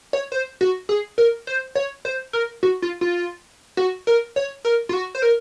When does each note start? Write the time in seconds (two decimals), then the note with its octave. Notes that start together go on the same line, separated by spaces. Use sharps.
0.13 C#5
0.32 C5
0.61 F#4
0.89 G#4
1.18 A#4
1.47 C5
1.75 C#5
2.05 C5
2.33 A#4
2.63 F#4
2.82 F4
3.01 F4
3.77 F#4
4.07 A#4
4.36 C#5
4.65 A#4
4.89 F4
4.93 F#4
5.15 C5
5.22 A#4